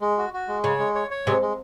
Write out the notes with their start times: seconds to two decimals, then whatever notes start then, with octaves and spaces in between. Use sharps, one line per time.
0.01 G#3
0.18 F#4
0.33 F#4
0.48 G#3
0.64 C#3 C#5
0.79 G#3
0.95 C#5
1.11 C#5
1.27 C3 G#3
1.42 G#3